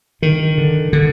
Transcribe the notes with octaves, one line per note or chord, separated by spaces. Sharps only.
D3 D#3
D3
D3